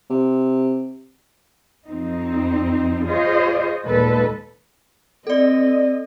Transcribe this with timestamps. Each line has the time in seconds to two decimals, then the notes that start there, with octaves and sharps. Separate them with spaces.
0.10 C3
1.87 F2 C4 D#4
3.05 F4 G#4 C5 C#5 D#5
3.85 D#2 A#2 G#3 A4 B4
5.27 C4 A4 D5 D#5